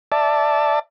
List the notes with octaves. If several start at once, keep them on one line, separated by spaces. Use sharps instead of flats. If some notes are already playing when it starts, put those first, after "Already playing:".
D5 E5 A5